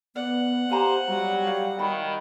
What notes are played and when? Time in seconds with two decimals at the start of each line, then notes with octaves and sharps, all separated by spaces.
0.16 B3 D5 F#5
0.70 G4 C5 F5 G#5 A#5
1.07 F#3 G3
1.47 G4 F5
1.79 D#3 B5